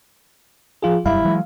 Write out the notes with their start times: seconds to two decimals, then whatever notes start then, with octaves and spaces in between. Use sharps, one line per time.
0.82 F3 F4 G#4
1.06 E1 F#2 G3 E4 F5
1.24 E3 F#3 G#3